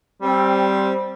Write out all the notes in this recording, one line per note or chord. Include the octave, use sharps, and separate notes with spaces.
G3 C4